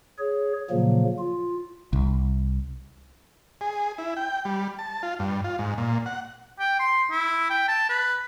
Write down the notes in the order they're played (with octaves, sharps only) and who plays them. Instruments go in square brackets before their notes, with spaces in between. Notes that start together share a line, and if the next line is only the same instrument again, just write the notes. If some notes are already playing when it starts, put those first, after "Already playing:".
[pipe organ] G#4 C#5
A#2 C#3 F3 F#3 A#3
F4
[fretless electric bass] C2
[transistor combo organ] G#4
E4
G5
G3
A5
F4
G2
F4
G#2
A#2
F#5
[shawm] G5
C6
E4
G5
A5
B4